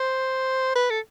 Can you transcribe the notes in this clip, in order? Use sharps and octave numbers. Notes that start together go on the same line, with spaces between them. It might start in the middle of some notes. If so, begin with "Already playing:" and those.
Already playing: C5
B4
A4